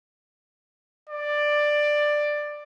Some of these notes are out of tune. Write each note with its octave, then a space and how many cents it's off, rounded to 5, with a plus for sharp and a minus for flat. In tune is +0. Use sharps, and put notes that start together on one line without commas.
D5 +10